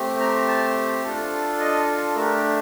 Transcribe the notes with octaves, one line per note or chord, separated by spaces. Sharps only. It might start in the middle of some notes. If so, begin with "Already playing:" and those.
Already playing: A3 C4 G4
A#5
A5
D4 F4 A4
D#5
A3 D4 G4 A#4